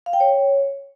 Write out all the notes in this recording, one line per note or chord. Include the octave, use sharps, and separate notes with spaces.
F5
G5
C#5